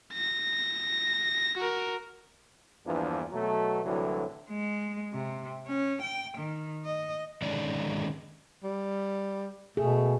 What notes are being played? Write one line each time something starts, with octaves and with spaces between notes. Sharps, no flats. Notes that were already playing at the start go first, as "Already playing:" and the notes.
A#6
F#4 A#4
E2 G2 E3 F3 A#3 D4
B2 F#3 A3
C2 A2 D3 E3 F#3
G#3
C3
C#4
G5
D#3
D#5
D3 D#3 G#3 C#4 D#4 D5
G3
B2 A3 G#4